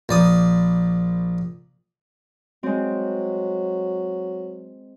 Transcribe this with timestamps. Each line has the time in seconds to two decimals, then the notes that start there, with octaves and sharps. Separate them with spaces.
0.09 A#1 D5 D#6
2.63 F#3 G#3 C4